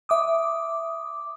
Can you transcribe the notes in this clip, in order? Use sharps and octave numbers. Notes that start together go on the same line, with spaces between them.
E5 D6 D#6